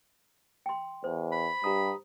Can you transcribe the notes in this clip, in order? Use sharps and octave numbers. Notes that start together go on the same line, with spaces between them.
G5 C6
E2 C5
B5
G2 G4 A#5 D#6